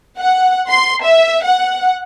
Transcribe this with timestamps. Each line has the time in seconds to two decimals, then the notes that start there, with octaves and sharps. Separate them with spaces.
0.19 F#5
0.70 C6
1.03 E5
1.44 F#5